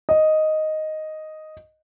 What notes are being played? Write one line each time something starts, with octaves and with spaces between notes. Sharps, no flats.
D#5